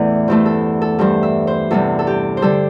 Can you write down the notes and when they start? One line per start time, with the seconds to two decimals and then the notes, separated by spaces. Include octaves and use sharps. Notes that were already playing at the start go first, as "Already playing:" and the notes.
Already playing: E2 A2 E3 A3 D5 E5
0.28 G2 E3 A3 C5
0.46 A4
0.82 A4
0.99 G2 E3 G3 C5
1.23 E5
1.47 C5
1.71 E2 C3 G3 A4
1.99 A4
2.07 G4
2.37 C5
2.42 D3 G3 A4